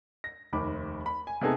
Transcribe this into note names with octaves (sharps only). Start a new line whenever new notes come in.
A#6
F1 D#2 B5 D6
B5
G#5
C3 A3 B3 D#4 G#4 A4